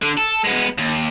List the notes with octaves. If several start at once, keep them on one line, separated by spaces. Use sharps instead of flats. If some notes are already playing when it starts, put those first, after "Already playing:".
D3
A4
G#3 B3
D#2